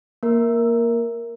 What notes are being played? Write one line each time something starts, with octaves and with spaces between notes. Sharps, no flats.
A#3 A#4